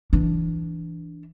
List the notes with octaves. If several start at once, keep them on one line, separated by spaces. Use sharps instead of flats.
E3 D4